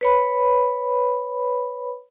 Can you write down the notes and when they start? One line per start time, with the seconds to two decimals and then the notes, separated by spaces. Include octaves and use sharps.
0.01 B4 C#5 B5